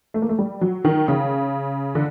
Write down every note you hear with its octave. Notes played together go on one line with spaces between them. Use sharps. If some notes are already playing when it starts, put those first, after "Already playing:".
A3
A#3
A3
G3
F#3
D#3
C#3
D3